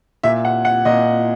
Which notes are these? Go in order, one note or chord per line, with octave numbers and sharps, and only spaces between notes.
A#2 E5
F#5
F#5
A#2 D#5